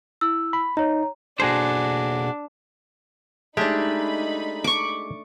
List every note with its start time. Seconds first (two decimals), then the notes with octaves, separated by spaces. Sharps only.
0.21 E4 E6
0.53 B5
0.77 D#4 C#5 A#5
1.40 B2 A#3 D4 F#4 G#4 A4 C5
3.57 G#3 A3 D4 D#4 G4 B5
4.64 C#6 D6